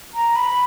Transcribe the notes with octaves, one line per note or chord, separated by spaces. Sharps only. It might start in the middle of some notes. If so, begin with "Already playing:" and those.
A#5
B5